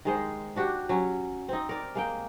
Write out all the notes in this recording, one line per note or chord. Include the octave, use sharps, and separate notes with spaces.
D#3 G#3 C5
D4 F#4 G4
F#3 C#4
C4 D#4
A#4 D5
G#3 A#3 G5